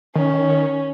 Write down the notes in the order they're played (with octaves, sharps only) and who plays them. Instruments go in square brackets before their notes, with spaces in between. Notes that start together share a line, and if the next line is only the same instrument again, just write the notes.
[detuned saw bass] D#3 [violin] C#4